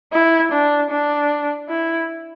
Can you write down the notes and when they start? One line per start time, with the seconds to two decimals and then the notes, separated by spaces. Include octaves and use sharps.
0.13 E4
0.52 D4
0.91 D4
1.69 E4